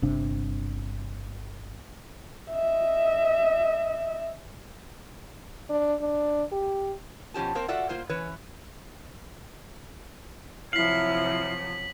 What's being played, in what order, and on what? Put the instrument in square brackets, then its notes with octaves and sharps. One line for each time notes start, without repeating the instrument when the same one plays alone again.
[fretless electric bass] G1 C3 D4
[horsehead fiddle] D#5 E5
[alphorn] D4
D4
G4
[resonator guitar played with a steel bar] B2 F3 C#4 G4 A5
A#3 C4 A#4 C5
F4 F#4 A4 D5 E5 F#5
A#3 F4 C5
E3 C#4 B4 C#5
[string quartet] C3 F3 F#3 [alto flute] E4 [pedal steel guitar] F5 [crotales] B6 F#7